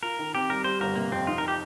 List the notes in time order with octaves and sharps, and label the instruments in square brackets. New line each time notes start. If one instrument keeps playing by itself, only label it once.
[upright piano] F4 [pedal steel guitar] A#4
[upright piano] D#3
[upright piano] C4 [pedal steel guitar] G4
[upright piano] G3 [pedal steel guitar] A#4
[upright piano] G3 [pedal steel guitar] C5
[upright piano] G1 [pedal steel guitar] A#4
[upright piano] C3 [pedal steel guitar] A#3
[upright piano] F2 [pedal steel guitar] C4
[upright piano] D#4 [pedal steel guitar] F4
[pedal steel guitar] A#4
G4